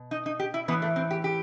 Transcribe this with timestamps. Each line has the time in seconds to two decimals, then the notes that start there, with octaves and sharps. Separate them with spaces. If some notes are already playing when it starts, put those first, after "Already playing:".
Already playing: B2
0.11 D#4
0.26 D#4
0.39 G4
0.54 E4
0.68 E3 B3
0.72 A2
0.82 A3
0.96 C4
1.11 G4
1.24 G4